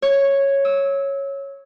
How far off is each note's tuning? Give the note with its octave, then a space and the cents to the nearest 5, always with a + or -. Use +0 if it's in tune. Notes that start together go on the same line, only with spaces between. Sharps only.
C#5 -5
E6 -25